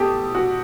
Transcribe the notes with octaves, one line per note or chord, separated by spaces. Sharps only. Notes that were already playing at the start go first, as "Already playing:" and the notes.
Already playing: B2 G4 A4
F#4